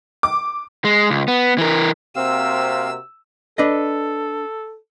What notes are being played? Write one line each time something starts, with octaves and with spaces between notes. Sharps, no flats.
D6
G#3
C#2
B3
E3 A#4
C3 A#3 C4 F#4 F5 E6
D4 A4 B4 D#5